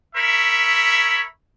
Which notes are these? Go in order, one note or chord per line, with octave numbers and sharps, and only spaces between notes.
A#4 C#5 E5 B5